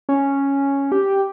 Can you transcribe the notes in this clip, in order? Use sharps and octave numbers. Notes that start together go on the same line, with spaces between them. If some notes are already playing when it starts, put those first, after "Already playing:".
C#4
G4